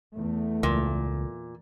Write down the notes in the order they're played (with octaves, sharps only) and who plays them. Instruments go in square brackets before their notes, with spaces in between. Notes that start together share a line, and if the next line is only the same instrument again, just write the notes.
[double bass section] E2 A3
[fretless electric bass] C#2 [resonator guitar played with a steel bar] A#2